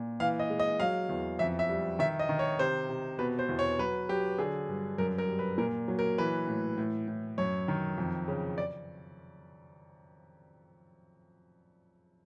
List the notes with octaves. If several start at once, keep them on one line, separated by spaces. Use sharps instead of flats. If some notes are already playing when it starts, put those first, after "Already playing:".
Already playing: A#2
E3 F5
D#5
G#3
D#5
F#3 F5
E2
F2 E5
E5
G3
D#3 E5
D#5
D#3
C#5
C3 C5
C3
B2 B4
C5
E2
C#5
F#3 B4
F#3 G4
D3 G#4
G2
F#2 A#4
A#4
G3
B4
A#2 A#4
F#3
A#4
E3 B4
A2
A2
A2
F#2 C#5
D#3
F2
C#3
D5